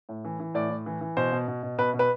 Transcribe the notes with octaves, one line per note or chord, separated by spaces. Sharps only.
A2
E3
E3
A2 D5
A2
E3
E3
B2 C5
B2
B2
B2
B2 B4
B2
B4